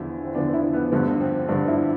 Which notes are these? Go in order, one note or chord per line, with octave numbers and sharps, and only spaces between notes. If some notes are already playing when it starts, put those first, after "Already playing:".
Already playing: E2 D3 F3 E4
C4
E2 D3 F3 D4
E4
B3
G2 D3 F3 B3
C4
G2 D3 F3 D4
E4